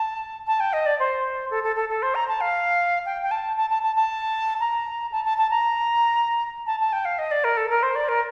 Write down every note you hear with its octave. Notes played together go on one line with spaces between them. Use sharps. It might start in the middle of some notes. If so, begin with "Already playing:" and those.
Already playing: A5
A5
G5
D#5
D5
C5
A4
A4
A4
A4
C5
A#5
A5
F5
G5
G5
A5
A5
A5
A5
A5
A#5
A5
A5
A5
A#5
A5
A5
G5
F5
D#5
D5
A#4
A4
A#4
C5
D5
A#4